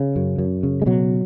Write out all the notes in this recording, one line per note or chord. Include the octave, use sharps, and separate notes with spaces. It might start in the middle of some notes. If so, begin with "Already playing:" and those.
Already playing: C#3
F#2
F#2
C#3
G#3
B2 F#3